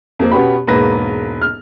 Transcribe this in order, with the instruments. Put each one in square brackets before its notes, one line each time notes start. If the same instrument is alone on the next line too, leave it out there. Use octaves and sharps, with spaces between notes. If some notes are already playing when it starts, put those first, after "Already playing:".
[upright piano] F2 A#3 C4
B2 B3 C#4 G4 B5
E1 G#2 A#3 B4 A#6
F6